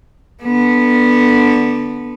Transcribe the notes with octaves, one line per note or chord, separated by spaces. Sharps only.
D3 B3